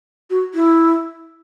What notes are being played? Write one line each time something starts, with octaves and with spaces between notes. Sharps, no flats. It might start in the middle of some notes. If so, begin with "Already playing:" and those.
F#4
E4